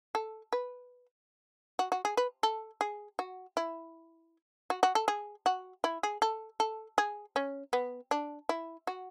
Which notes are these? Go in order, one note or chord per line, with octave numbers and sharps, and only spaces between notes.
A4
B4
F#4
F#4
G#4
B4
A4
G#4
F#4
E4
F#4
F#4
A4
G#4
F#4
E4
G#4
A4
A4
G#4
C#4
B3
D4
E4
F#4